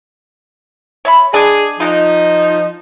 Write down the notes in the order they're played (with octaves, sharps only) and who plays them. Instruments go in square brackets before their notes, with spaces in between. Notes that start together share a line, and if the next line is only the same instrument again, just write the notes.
[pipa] C#5 E5 B5
[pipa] G#3 D4 D5 [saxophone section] G#4
[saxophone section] F3 D#4 [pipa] G#3 F4